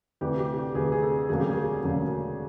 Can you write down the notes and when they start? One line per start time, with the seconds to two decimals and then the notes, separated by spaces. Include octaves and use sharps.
0.21 D2 C3 E3 G4
0.39 G4
0.58 G4
0.75 D2 C3 E3 G#4
0.92 G#4
1.02 A4
1.29 E1 D2 C#3 F#3 A#3 G#4
1.40 G4
1.51 G#4
1.83 E1 D2 C#3 F#3 A#3